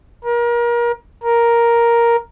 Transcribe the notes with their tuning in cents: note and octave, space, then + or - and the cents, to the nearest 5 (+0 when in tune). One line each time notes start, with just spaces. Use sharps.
A#4 +30
A#4 +5